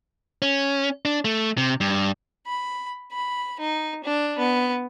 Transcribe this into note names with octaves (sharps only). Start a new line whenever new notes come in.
C#4
D4
A3
C3
G2
B5
B5
D#4
D4
B3